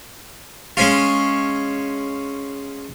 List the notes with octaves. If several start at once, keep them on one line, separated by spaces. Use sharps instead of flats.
G#3 C#4 F4